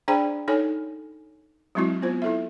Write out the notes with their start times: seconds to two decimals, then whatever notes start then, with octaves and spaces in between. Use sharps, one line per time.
0.08 D4 G#4 C5 D5 G5 B5
0.48 D#4 A4 C#5 G#5
1.75 F#3 G#3 C4 E4 F#4
2.02 B3 F4 C5
2.22 E4 A4 E5